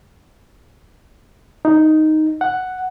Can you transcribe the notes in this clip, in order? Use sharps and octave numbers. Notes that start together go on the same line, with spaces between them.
D#4
F#5